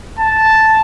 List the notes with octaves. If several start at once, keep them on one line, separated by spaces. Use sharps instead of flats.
A5